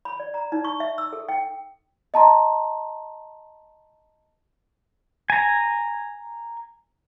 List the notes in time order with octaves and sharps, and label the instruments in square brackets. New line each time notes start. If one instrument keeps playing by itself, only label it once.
[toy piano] B5
D5
A#5
D#4
C#6
E5
E6
A4
G5
[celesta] D#5 A5 A#5 C6
[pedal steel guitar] G#5 A#5